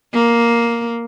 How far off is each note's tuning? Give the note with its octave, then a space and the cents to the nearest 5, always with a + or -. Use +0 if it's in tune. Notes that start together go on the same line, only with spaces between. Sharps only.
A#3 +5